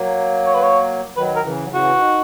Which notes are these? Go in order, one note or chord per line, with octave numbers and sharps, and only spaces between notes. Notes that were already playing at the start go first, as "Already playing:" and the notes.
Already playing: F#3 A#3
C#5
B4
C#5
D#3 F#3 B4
A#4
C#3 E3
F#3
C#3 E3
F#4
D#3